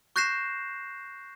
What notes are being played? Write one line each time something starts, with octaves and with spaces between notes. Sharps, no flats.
C#6 F#6 G6 A#6 C7 E7